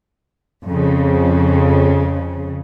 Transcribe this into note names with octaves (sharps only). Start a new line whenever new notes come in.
F2 C#3